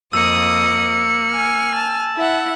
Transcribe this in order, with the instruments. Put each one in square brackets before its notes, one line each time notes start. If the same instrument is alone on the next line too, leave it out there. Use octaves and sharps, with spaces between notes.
[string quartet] F2 D#5 D#6 [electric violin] A#3 C#7 [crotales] E6
[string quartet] G#5 F6
[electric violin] A5
[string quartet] E4 E5 F#5